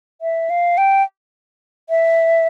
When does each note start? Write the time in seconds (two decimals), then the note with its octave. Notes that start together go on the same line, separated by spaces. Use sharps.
0.21 E5
0.50 F5
0.78 G5
1.90 E5